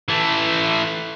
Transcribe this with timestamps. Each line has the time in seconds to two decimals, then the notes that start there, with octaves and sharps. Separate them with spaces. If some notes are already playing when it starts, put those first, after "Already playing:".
0.08 E3 A3